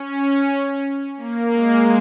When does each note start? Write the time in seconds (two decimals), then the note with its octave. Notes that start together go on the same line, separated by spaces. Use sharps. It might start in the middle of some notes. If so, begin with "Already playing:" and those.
Already playing: C#4
1.17 A#3
1.52 G#3